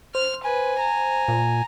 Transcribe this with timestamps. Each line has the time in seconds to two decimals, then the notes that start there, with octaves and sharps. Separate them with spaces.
0.15 C5 F6
0.44 B4 G#5
0.80 A#5
1.28 A#2